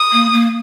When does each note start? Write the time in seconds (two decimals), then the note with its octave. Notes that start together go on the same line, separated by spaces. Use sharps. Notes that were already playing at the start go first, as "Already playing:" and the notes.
Already playing: D#6
0.12 A#3
0.33 A#3